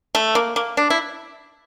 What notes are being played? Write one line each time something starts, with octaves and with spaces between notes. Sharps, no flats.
A3
A#3
A#3
D4
E4